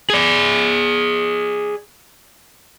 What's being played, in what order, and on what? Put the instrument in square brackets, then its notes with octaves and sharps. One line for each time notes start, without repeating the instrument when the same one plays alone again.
[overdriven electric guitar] G#4 D5